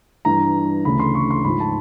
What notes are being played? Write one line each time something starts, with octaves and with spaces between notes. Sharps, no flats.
G2 E3 A#5
D2 C#3 E3 B5
C6
C#6
C6
G#2 F3 B5
A5